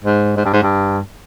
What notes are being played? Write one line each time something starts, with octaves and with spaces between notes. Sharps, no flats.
G#2
G#2
G2
G#2
G2